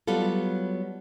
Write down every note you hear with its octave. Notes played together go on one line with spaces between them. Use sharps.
F#3 G3 B3 F4 A4